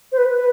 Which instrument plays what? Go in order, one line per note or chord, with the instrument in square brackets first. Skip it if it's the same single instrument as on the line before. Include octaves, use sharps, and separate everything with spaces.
[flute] C5
B4
B4